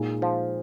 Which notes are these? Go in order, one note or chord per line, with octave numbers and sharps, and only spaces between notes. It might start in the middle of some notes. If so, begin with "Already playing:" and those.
Already playing: A#2 G#3 D#4
F3